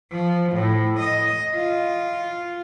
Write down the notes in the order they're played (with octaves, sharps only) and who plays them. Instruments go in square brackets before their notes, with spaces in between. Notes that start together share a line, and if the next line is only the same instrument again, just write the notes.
[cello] F3
A2
D#5
F4